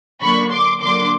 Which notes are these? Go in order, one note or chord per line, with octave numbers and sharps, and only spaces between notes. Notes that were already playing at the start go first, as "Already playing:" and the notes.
D3 F#3 A#3 D4 B5 C#6
C6 D6
D3 F#3 A#3 D4 C6 D6